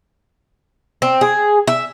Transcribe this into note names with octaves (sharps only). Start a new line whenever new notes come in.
C4
G#4
E5